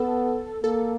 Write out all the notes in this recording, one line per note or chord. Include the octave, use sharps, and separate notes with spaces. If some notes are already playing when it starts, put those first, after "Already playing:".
Already playing: B3 A4
A#3 A4